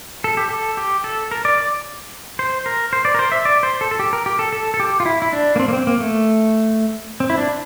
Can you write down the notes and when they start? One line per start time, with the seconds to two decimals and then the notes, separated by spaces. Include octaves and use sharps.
0.24 A4
0.37 G4
0.50 A4
0.77 G4
1.04 A4
1.31 A#4
1.45 D5
1.58 D5
2.39 C5
2.66 A#4
2.93 C5
3.05 D5
3.14 A#4
3.19 C5
3.32 E5
3.45 D5
3.63 C5
3.81 A4
3.91 A4
3.99 G4
4.13 A#4
4.26 G4
4.39 A4
4.52 A4
4.74 A4
4.80 G4
5.00 F4
5.06 E4
5.22 E4
5.33 D4
5.56 A#3
5.60 C4
5.68 A#3
5.73 C4
5.87 A#3
6.00 A3
7.20 C4
7.30 E4
7.38 D4